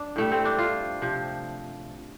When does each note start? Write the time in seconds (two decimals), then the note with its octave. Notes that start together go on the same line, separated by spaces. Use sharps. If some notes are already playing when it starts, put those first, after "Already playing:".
Already playing: D4
0.16 A2 G3 A3
0.32 C4
0.45 D4
0.58 F4
1.02 C3 F3